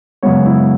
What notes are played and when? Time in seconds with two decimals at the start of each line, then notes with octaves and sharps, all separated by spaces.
0.23 F#2 C#3 G#3 B3 C#5
0.46 E4